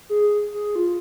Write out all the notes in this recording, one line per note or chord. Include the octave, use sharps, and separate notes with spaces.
G#4
G#4
F4